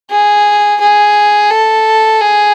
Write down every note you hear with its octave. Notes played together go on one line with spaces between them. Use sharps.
G#4
G#4
A4
G#4